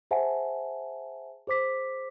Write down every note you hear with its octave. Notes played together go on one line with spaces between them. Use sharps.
G#4 C5 E5 F#5 G#5 A5
G#4 C5 D6 B6